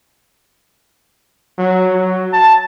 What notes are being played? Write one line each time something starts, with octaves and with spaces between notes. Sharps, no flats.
F#3
F#3
A5